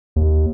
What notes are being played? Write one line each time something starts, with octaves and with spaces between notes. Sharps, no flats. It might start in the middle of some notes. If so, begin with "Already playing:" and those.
D#2